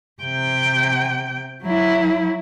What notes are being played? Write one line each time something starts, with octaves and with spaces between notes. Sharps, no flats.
C3 G5
F#3 E4